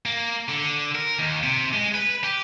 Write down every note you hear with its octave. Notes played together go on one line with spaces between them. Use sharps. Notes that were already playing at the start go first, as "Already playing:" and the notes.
A#3
D3
A#4
D#2
C3
G#3
B4
G4